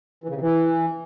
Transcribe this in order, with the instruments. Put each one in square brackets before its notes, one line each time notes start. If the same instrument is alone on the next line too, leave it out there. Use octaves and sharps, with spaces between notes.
[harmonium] E3
C#3
C3
E3